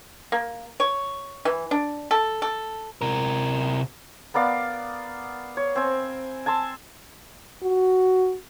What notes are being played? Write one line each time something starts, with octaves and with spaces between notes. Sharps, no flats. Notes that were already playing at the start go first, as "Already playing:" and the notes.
A#3
C#5
E3
D4
A4
A4
C3 A#4
B3 A#4 D5 F5
C#5
C4 G#5
G#5 A5 C6 E6
F#4